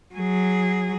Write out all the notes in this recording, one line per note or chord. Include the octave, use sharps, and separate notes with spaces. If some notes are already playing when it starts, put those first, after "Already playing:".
F#3 G#4